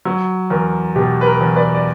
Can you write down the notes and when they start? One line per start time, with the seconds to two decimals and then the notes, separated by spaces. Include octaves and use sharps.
0.05 F#3
0.50 E2 A#4
0.95 B2 G4
1.21 B4
1.26 A#4
1.41 E2
1.56 B4 D5
1.75 D5